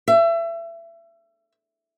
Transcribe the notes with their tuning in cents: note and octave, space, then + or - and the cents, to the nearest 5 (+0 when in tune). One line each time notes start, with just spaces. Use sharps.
E5 +30